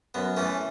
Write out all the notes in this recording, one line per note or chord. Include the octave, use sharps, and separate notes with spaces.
F#2 B3
E3 A3 C#4